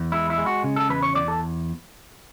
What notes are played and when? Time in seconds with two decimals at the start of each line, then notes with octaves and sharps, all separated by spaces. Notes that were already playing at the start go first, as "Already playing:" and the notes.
Already playing: E2
0.12 G#3 E4
0.30 E4
0.38 G#3
0.46 F#4
0.64 C#3
0.76 A4
0.89 E2 B4
1.03 C#5
1.15 E2 D5
1.28 A4